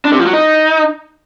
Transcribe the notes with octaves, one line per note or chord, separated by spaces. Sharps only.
D4
C3
F3
F#3
D#4